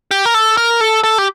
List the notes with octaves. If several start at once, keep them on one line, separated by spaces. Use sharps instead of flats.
G4
A#4
A4
A#4
A4
A4
G4